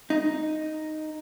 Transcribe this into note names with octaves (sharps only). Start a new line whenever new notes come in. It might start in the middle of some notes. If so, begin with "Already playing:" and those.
D#4